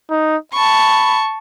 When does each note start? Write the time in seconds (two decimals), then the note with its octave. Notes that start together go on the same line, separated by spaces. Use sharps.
0.10 D#4
0.53 A5 B5 C#6